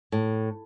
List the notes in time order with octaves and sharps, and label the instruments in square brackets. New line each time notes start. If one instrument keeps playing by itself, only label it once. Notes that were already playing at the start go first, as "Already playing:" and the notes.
[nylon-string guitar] A2